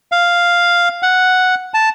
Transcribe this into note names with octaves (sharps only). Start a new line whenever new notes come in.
F5
F#5
A5